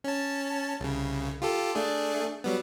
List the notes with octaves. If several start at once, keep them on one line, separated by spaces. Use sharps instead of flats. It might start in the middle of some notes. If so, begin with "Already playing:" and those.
C#4 A5
C2 C#3
F4 G4 A4
A3 D4 G#4
F#3 G3 B3